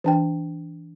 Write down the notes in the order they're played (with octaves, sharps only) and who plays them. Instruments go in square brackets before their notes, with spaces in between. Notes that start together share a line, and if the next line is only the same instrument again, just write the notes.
[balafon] E3 D4 G5